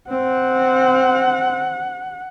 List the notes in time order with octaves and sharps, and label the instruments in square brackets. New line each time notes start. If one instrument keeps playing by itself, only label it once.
[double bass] C4 [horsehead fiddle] F#5